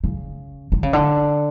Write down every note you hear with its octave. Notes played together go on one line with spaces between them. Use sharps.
C#3
D3
C#3
D3